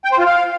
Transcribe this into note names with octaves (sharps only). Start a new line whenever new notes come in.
G5
C5
F4
F5